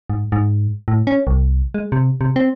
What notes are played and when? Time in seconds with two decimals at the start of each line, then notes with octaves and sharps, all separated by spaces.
0.10 G#2
0.32 G#2
0.88 A2
1.07 C#4
1.27 C2
1.74 G#3
1.92 C3
2.21 C3
2.36 C4